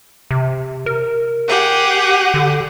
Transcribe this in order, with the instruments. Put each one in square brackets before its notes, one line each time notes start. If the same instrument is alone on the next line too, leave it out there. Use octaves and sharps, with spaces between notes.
[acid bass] C3
A#4
[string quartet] G4 G#4 F#5
[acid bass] D3